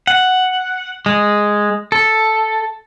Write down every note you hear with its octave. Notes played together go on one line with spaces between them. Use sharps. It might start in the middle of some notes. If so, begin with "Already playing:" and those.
F#5
G#3
A4